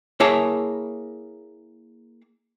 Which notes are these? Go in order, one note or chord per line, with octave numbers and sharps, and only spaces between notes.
A#3 E4 G#4 C#5 A5